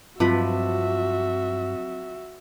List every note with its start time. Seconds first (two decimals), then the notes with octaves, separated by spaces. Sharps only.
0.20 G2 F3 F#3 C4 F4 F#4 B4 E5